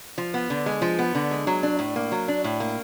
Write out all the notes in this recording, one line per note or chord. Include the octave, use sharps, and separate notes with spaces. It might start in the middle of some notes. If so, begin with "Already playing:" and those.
F3
B3
D3
G#3
F3
B3
D3
G#3
F#3
D4
A2
A#3
F#3
D4
A2
A#3